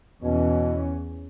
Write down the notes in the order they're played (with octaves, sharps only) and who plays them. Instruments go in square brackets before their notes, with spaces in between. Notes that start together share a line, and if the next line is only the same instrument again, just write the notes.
[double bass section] E2 E3 C#4 [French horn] B2